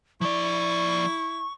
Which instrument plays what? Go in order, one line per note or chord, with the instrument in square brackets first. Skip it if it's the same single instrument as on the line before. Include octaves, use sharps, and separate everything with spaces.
[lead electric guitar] F3 D5 [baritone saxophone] E4 [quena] C#6